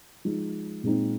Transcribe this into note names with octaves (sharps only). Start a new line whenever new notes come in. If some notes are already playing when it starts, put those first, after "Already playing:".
F3 G#3 D#4
A#2 G#3 C4 D#4